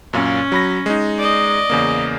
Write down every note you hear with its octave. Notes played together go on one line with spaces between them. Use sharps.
F#2 A#2 C#4 F5
F#3 B5 A#6
G#3 D#4
D5 D#5
E2 C#3 A#3